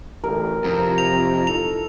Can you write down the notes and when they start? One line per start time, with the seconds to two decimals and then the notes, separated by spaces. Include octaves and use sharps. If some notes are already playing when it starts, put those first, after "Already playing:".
0.24 A1 D2 A#4
0.64 F2 C3 F4 A#5
0.98 F7
1.47 D#4 E4 A4 F7